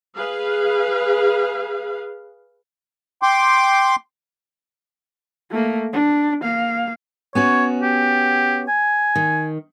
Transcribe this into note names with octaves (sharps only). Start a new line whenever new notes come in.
G#4 B4 F5
G5 C6 D6
A3 A#3
D4
A#3 F5
B3 C#4 F#4 C#5
G4
G#5
D#3